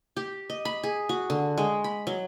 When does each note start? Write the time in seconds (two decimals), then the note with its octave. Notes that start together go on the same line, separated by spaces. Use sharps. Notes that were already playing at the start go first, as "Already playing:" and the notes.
0.17 G4
0.50 D#5
0.65 B5
0.83 G#4
1.09 F#4
1.30 D3
1.58 G#3
1.84 B5
2.07 F#3